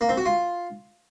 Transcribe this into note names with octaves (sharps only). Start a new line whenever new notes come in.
A#3
C4
F#4
F4